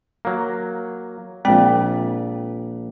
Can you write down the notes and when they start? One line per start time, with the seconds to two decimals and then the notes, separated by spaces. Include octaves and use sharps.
0.25 F#3 A#3
1.45 A#1 G#3 C4 D5 G5